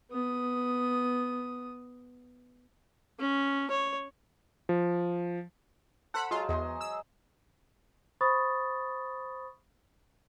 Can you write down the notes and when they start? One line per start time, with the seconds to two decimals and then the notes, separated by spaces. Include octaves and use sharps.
0.11 B3 D#6
3.20 C#4
3.71 C#5
4.69 F3
6.14 A4 C5 F#5 B5
6.31 F#3 G#3 F4 G#4
6.49 E2 D#5 C6
6.81 E6
8.21 C5 B5 C#6 D#6 A6